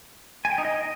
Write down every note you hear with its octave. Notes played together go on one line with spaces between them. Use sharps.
G#5
G5
D#4
D#5